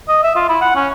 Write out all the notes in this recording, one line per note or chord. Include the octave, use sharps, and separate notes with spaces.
D#5
E5
F4
E4
F#5
C#4